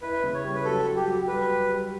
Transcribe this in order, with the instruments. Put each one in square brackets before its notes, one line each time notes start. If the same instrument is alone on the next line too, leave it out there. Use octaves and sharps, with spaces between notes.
[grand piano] E4 [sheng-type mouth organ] B4
[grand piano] C#3
[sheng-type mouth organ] C#5
[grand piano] G3
[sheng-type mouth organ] B4
[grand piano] F#3 [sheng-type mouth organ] A4
[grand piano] F#3
[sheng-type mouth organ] G4
[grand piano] F#3
[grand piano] G3 [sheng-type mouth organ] B4
[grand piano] G4
G3